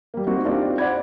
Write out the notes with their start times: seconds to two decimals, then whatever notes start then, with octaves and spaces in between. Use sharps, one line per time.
0.14 G3 A#3
0.27 G3 A#3 C4 D#4 F#4
0.44 C4 D4 D#4 F4 G4 D5
0.78 C5 D5 F#5 B5 G#6